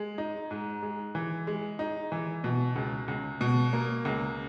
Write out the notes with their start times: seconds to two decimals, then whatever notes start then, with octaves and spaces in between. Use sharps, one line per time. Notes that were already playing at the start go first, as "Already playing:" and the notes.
Already playing: G#3
0.18 D#4
0.51 G#2
0.83 G#3
1.15 E3
1.47 G#3
1.79 D#4
2.12 E3
2.44 B2
2.76 C#2
3.08 C#2
3.41 B2
3.73 A#3
4.05 C#2